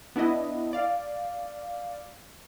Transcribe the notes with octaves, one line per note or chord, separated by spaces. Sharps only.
B3 D4 E4 D#5
D5 F5